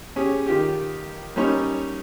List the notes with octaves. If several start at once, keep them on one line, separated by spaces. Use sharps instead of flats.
C#4 G4 G#4
D#3 F4 G4
G3 A#3 C#4 D#4 C#6